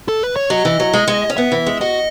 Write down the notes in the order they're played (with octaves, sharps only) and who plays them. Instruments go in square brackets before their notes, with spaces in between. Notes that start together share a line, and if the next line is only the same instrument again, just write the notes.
[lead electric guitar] A4
B4
C#5
[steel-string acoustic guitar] F#3 [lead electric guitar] D#5
[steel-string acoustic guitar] E3
F#3
G#3
G#3
C#4
[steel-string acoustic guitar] B3 [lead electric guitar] E5
[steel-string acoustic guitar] E3
G#3
[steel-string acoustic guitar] F#4 [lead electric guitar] D#5